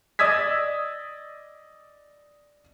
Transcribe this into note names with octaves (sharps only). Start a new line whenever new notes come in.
D5 D#5 D#6 E6 G#6 B6